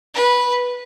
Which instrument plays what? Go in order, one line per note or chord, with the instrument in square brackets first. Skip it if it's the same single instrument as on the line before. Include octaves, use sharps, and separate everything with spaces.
[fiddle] B4